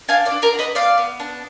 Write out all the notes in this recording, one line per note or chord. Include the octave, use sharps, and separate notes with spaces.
D4 F5 G#5
D5 F5
D4
A#4 D5
F#4
B4 D#5
B3 D5 F5
B3
D4